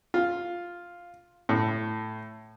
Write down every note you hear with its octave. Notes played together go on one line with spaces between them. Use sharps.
F4
A2